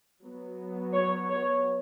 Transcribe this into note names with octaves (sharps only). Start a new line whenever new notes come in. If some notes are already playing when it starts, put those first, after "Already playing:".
F#3 B3
C#5
C#5